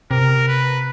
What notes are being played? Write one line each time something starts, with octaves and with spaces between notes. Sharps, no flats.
C3 A#4
B4